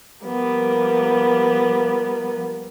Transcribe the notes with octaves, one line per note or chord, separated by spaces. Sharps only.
F3 G3 A#3 B3